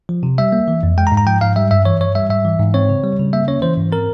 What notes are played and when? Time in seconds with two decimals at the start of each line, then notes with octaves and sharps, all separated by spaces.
0.09 F3
0.23 C3
0.38 G3 E5
0.52 A#3
0.68 E3
0.83 F2
0.98 G#3 G5
1.07 A#5
1.12 G#2
1.17 A#5
1.27 F3 G5
1.41 G#2 F5
1.56 G3 E5
1.71 G2 E5
1.85 E3 C#5
2.00 G2 C#5
2.15 G3 E5
2.30 G#2 E5
2.45 E3
2.59 G#2
2.74 C4 C#5
2.89 C#3
3.04 G3
3.19 C#3
3.33 A#3 E5
3.48 C#4 C#5
3.62 E3 C5
3.77 G#2
3.92 C4 A#4